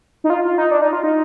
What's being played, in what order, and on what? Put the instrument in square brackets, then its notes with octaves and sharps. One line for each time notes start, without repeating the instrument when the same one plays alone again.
[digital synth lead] D#4
F4
F4
D#4
D4
D#4
F4
D#4